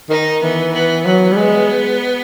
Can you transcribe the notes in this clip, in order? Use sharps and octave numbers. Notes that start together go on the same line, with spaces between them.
D#3 D#4
E3 B3
B3
F#3 B3
G3
G#3